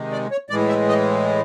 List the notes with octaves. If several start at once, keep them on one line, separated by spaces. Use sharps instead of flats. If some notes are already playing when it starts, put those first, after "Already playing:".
Already playing: C3 D#3 G#3
D5
C#5
A2 E3 G#3 D5
E5
D#5